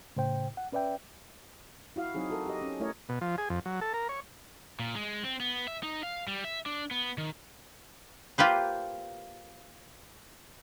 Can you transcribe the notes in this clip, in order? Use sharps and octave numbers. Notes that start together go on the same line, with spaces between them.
A2 C#3 C5 G5
F#5
C#4 B4 D5 E5 G5
E4 F#4 F5
F#3 C4 D#4 G#4
F#4 A4 A#4
G4 D#5
C#4
A3 E4 A#4 C#5 D#5
B2
F3
G#4
F2
F#3
A4
A#4
C#5
A#2
G#3
C4
B3
E5
D#4
F5
G3
E5
D4
B3
D#3
A#3 F4 G4 B4 C5